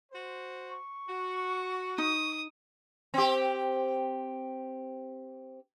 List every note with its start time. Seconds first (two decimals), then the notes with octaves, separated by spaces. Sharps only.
0.12 F#4 C5
0.69 C#6
1.09 F#4
1.98 D#4 D#6
3.14 C4 G4